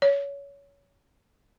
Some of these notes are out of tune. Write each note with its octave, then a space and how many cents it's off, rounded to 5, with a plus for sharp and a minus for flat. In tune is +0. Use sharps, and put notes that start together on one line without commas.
C#5 +20